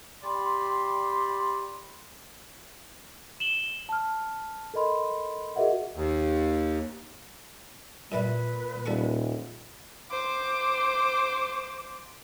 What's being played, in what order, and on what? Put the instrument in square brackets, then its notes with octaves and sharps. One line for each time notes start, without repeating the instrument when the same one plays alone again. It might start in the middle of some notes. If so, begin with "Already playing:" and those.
[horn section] G4 D5 B5 C6
[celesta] E7 F#7 G7
A5 F6
A4 A#4 D#5 B5 C6
F#4 G#4 A#4 D#5 E5 F#5
[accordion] D#2
[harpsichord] F#2 E3 G3 [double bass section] A#2 [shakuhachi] B4
[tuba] D#1 [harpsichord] G3 A4 C#6
[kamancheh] C5 D6